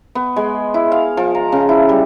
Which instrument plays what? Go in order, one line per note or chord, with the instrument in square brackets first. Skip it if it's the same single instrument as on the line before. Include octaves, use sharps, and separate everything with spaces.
[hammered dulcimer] B3
G#3
E4
F5
F3
A#5
C#3
E4
G3